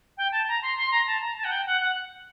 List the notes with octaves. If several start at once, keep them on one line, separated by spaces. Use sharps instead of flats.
G5
A5
A#5
C6
C6
A#5
A5
A#5
A5
F#5
G5
F#5
F#5